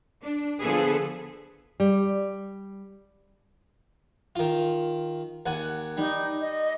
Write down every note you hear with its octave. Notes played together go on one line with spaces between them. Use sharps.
D4
D3 F3 B3 G#4 A4 B4
G3
D#3 F4
D#2 F#5 G#5
G3 D#4
D#5